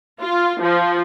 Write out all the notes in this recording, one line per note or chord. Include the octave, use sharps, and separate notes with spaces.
F4
F3